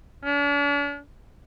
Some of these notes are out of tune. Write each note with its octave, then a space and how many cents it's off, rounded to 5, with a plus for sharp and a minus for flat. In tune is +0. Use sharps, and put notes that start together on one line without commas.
D4 -45